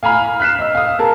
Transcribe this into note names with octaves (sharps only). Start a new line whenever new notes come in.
F5 G#5 A#5 B5 F6
F6 F#6 B6 C7 E7
D#5 E6
F5 D#6
G#4 A#4 A5